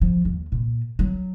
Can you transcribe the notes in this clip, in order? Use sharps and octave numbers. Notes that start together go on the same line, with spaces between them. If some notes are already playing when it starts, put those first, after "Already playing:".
F3
D#2
A#2
F#3